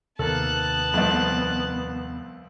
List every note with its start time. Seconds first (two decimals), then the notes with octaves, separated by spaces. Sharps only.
0.19 D#2 C3 D#3 A#3 B3 A4 A5 F#6
0.94 C2 F2